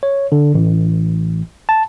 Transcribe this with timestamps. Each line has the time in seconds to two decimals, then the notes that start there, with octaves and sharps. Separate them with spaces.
0.03 C#5
0.32 D3
0.54 A1
1.69 A5